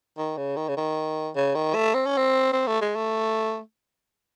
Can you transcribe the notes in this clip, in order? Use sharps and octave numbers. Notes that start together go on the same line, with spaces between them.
D#3
C#3
D#3
C#3
D#3
C#3
D#3
A3
C4
C#4
C4
C4
A3
G#3
A3